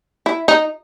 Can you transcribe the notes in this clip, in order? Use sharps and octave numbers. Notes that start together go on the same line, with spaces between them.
E4
D#4